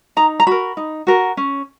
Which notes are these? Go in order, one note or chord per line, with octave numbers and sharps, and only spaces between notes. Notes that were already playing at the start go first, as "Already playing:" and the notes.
D#4 A#5
A#5
F#4 A#4 B5
D#4
F#4 A#4
C#4